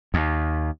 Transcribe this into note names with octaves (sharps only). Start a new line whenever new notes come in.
D#2